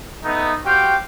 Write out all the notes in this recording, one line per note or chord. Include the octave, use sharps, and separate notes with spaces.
A3 B3 D#4
F#4 G4 C5 F5 G5